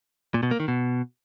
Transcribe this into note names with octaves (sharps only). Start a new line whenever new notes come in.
A#2
B2
A#3
D#3
B2